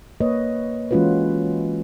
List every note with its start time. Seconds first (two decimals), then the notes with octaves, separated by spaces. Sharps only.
0.21 A#3 B4 C#5 D#5
0.91 E3 G#3 C#4 F4 F#4 B4